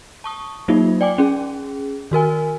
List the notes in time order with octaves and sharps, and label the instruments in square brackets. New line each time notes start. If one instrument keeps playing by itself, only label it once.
[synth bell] A5 C#6 D#6
F#3 A#3 D#4 F4
D5 G5 G#5 D6
C#4 G#4
D#3 F#4 A#4 G#5